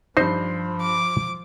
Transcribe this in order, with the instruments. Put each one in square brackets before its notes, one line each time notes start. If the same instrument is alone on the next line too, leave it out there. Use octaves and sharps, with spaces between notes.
[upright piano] G2 G6 C7 [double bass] F3 [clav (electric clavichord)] D#4 C5
[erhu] D6